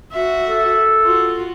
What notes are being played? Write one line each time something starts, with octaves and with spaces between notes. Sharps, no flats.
F#4 E5
A4
F4 F#4